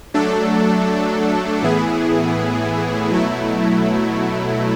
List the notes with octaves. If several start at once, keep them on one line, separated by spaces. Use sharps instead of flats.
F#3 A3 D4 A4
A2 E3 B3 E4 G#4
B2 F#3 A3 E4